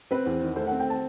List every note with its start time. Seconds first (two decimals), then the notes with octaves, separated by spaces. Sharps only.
0.11 C4 B4
0.26 E2
0.42 D#3
0.56 A3 C5
0.67 F#5
0.71 C4
0.80 G5
0.90 A5